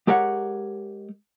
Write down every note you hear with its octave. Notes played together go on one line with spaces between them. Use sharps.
G#3 G4 A#4 C#5 F#5